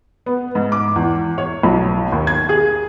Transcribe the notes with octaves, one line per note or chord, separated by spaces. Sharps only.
B3
G#2
D6
E2
C#5
B1
D#2
G#6
G#4